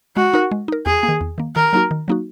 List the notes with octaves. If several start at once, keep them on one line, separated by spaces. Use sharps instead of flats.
G#3 F#4
D#4 A#4
G#3
D#4 A#4
E2 G#4
A#3
D#3
E2
D#3 A#3
D#3 A#4
F#3 A#3 D#4 F#4
D#3
F#3 A#3 D#4 F#4